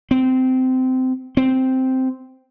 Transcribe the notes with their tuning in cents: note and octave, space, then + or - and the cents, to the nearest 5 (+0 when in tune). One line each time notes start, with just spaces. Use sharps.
C4 -20
C4 -5